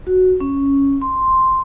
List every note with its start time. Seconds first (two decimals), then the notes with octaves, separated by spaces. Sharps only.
0.07 F#4
0.40 C#4
1.01 C6